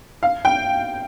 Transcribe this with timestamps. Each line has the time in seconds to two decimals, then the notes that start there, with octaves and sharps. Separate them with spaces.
0.23 F5
0.45 G5